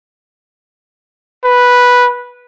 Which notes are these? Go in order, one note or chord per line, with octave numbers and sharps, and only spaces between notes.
B4